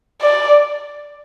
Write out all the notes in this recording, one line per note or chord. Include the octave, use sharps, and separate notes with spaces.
D5